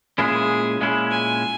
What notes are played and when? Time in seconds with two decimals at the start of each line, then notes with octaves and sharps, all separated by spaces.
0.18 A#2 G#3 C#4 E4 G#4
0.81 A#2 G#3 C#4 E4
1.11 G#5